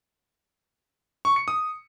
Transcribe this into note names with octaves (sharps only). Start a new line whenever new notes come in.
C#6
C#7
D#6